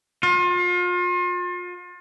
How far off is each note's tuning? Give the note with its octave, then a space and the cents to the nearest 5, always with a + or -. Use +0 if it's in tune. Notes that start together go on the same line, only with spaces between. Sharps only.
F4 +35